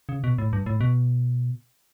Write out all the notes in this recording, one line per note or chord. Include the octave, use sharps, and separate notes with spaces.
C#3
B2
A2
G2
A2
B2